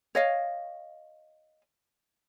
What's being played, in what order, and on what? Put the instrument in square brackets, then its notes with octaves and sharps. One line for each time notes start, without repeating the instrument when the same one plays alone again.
[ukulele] C#5 D#5 F5